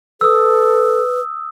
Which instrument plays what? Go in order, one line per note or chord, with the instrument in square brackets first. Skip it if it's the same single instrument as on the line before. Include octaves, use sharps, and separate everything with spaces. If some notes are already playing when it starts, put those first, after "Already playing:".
[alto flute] A4 [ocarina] B4 [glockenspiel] D#6 E6